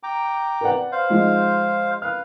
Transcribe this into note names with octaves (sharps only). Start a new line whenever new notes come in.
G5 A#5 D6
B4 D5 F#5
C5 F5
F3 G#3 D#4
B4 F5 F6